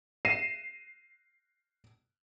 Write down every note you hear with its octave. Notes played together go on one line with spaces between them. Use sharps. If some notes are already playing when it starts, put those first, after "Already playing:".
A#6 C7 D#7 E7